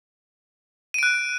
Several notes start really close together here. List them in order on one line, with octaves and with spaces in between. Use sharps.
D#7 D7 F#6